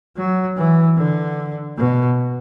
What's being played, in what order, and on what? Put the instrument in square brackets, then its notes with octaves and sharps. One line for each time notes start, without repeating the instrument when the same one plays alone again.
[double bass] F#3
E3
D3
B2